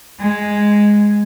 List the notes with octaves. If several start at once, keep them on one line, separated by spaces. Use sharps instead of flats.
G#3